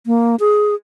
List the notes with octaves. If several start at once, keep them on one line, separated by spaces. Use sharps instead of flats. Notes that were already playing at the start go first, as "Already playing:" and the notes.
A#3
G#4